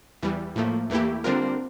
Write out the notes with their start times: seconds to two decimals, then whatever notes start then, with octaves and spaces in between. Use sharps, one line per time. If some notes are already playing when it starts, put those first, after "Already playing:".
0.23 E2 E3 G3
0.56 A2 F3 A3 A#3
0.90 E2 E3 A3 A#3 E4 G4
1.24 D3 G3 C4 D4 F4 A#4